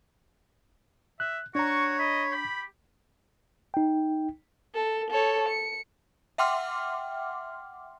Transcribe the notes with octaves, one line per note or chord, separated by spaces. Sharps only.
E5 F#6
D4 F#4 C#5 A#5 C#6
D#5 B5
G4 B5
D#4 G5
A4
A4 C#5
C#7
E5 F#5 G5 C6 D6 F6